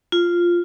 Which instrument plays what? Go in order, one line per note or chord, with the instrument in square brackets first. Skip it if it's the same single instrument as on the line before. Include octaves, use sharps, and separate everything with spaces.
[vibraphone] F4